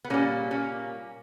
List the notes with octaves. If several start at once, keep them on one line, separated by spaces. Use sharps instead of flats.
B3
A#2 G3 A#3 C#4
A#3 C#4